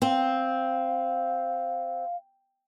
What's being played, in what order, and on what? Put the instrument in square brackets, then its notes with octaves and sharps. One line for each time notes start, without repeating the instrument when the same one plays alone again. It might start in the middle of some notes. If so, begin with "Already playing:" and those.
[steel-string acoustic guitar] C4 [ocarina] F5